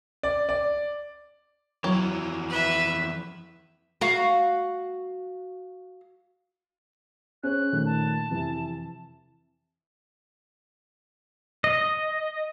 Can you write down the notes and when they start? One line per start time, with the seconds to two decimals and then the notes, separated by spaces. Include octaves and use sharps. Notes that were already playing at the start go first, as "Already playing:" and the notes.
0.23 D5
0.49 D5
1.84 F2 E3 F#3
2.49 B4 E5
4.01 F#4 F5
7.43 C#4 G#4 C5 F#6
7.72 A#2 D#3 A3
7.85 A5
8.30 F2 C3 E3
11.64 D#5